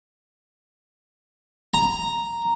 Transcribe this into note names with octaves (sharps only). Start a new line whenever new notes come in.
A#5